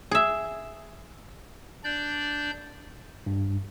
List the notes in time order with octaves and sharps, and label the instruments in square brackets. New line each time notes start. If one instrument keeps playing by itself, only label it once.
[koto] G#4 E5
[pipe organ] D4 D5 G6
[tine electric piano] G2